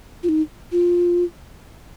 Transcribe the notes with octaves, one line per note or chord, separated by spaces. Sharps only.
F4
D#4
F4